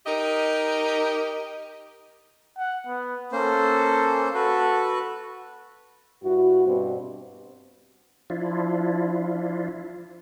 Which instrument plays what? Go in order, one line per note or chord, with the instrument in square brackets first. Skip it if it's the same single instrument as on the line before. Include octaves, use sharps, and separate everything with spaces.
[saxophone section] D#4 G4 A#4 D#5
[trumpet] F#5
B3
[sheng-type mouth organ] A#3 C#4 C5 [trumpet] A4
[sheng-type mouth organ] F#4 B4 [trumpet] A4
[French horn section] G2 E4 F#4
G2 B2 C4 C5
[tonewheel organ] F3 D4 E4 F4